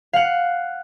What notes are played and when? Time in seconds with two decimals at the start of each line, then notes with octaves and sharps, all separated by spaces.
0.13 F5 F#5